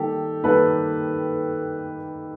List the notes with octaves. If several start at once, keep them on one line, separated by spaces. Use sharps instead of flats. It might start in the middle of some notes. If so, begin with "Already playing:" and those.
Already playing: D#3 G3 A#3 G4 A4
D#3 G3 A#3 A4 B4